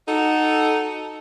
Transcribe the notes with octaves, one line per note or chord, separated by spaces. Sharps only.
D#4 F#4 A4